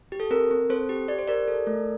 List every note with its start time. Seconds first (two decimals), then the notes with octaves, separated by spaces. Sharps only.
0.12 G4
0.20 A4
0.31 C4 A#4
0.51 C4
0.70 C4 A4 C5
0.89 G4
1.08 G4 D5
1.19 C5
1.28 G4 A#4 D5
1.48 A4
1.67 A3